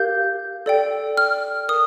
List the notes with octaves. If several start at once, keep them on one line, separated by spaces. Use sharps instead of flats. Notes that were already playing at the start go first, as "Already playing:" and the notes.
Already playing: G4 A#4 F5 G6
A4 D5 G5
F6
A#4 D#6